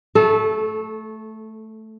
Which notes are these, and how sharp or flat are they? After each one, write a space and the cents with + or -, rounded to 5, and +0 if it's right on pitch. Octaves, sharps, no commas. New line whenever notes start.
A3 +0 A4 -25